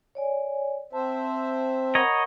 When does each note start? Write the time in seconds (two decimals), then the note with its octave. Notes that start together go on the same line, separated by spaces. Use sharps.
0.15 C#5 D5 G#5
0.93 C4 C5 E5 A5
1.95 A#4 C#5 D#5 F#5 A#5 B5